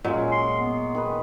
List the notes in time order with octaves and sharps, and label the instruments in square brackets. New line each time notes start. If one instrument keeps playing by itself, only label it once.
[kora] A#2 [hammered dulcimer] F#3 G#3 [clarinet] C#4
[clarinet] C6
B3
[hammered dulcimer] D#3 G#4 B4